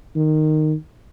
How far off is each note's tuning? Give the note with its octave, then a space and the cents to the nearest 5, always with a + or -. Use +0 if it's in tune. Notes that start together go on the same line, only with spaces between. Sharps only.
D#3 -10